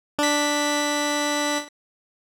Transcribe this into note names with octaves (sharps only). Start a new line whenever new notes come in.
D4 B6